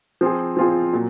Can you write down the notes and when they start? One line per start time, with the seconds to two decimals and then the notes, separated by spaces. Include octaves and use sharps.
0.21 F3 C4 F4 G#4
0.57 F3 C4 F4 G#4
0.93 A#2 F#3